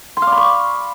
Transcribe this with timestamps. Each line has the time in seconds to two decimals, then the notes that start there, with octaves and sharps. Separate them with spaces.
0.17 C6
0.22 F5
0.27 D5
0.32 B5
0.37 C#6